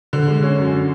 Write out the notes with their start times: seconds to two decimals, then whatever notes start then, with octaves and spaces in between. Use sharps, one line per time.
0.13 D3
0.28 G#3
0.43 C#4
0.58 F#2
0.73 D3